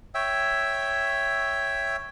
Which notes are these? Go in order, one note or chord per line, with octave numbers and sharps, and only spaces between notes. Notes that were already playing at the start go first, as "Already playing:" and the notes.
C#5 E5 G5 E6